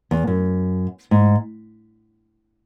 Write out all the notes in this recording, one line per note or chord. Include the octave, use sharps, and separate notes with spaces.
E2
F#2
G#2